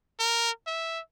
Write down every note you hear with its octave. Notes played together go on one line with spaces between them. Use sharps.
A#4
E5